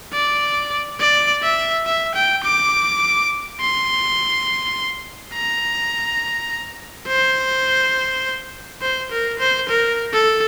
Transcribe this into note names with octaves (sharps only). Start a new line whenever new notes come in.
D5
D5
E5
E5
G5
D6
C6
A#5
C5
C5
A#4
C5
A#4
A4